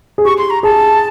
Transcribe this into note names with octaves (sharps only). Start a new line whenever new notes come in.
G#4
G4 C#6
C6
A#5
G#4 A5